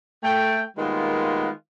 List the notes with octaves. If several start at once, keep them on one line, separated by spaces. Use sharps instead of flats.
A3 G5
D#3 G3 G#3 A#3 B3 F4